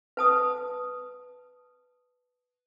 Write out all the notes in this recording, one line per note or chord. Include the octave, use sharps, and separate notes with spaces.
B4 A5 D#6